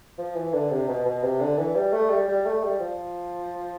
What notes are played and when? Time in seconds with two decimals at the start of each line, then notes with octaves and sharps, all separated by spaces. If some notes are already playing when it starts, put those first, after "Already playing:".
0.18 F3
0.36 E3
0.53 D3
0.71 C3
0.89 B2
1.06 B2
1.23 C3
1.41 D3
1.58 E3
1.76 G3
1.93 A3
2.10 G3
2.28 G3
2.46 A3
2.64 G3
2.80 F3